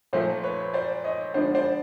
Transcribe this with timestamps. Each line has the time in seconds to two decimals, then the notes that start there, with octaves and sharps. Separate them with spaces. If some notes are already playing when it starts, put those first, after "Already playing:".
0.13 A#2 F3 A3 C5
0.43 B4 C#5
0.74 C5 D5
1.04 C#5 D#5
1.34 D3 F3 G#3 B3 D4 C5 D5
1.55 C5 D5